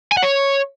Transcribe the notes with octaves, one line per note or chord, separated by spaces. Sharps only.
G#5
F#5
C#5